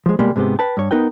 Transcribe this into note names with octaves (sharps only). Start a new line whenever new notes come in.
F3 G#3
B2 G3 G#3 A#3
G#2 C3 G#3 B3 G4
B4 G5 A5
G2 C#5
B3 D#4 A#4 B4 G5